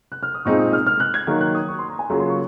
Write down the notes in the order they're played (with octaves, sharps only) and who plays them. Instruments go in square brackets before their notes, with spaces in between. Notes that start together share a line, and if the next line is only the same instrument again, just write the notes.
[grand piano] F#6
F6
D#6
[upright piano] A#2 G#3 C4 D#4 [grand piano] C#6
[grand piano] D#6
F6
F6
F#6
G#6
[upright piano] D#3 F#3 A#3
[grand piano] F#6
D#6
C#6
C6
A#5
G#5
[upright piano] C#3 F#3 A#3 F4 [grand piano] A#5
[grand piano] C6
C#6